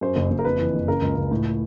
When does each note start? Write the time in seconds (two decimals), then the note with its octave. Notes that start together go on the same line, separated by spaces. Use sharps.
0.01 F#2 C5
0.16 F#1
0.30 F#1
0.39 A#4
0.45 F2 B4
0.59 E3
0.74 F#1
0.88 C#3 A#4
1.02 C#2
1.16 C#2
1.31 A2